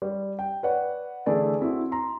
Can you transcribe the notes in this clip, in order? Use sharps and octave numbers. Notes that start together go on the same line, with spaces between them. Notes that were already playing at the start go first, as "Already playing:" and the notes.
G3
G5
B4 C#5 D5 F#5
D3 E3 A3 E4 G#4 D5
C4 E4 F#4
A#5 C6